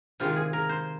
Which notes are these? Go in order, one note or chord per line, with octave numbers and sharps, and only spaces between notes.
C3 D#3 G#3 F4
G#4
A#4
C5